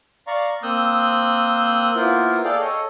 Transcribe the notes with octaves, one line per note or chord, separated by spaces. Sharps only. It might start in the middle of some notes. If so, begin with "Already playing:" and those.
D5 F5 A#5 C#6
A#3 C4 D#6 E6 F#6 G6
A#3 B3 E4 F4 A#4 C5
G#4 A4 D5 F5 G5
A4 C#5 D#5